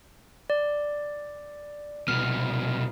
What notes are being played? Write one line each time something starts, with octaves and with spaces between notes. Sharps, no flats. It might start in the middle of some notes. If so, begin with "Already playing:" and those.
D5
C2 B2 F6